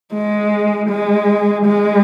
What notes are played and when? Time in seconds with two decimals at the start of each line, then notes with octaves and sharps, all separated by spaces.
0.14 G#3
0.89 G#3
1.66 G#3